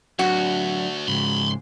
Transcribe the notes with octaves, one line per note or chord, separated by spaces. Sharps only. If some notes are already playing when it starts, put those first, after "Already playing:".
D2 F#3 D4 F#4
G#2 C#3 G#3 B5 C6